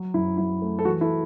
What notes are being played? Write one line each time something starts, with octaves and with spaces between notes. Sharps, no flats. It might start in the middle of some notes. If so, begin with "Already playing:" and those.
Already playing: F#3
F#2 E4
F#3 E4
A3
A4
E3 F#4
E4 A4